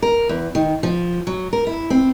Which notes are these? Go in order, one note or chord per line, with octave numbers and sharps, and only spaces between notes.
A#4
E2
D#3
F3
F#3
A#4
E4
C4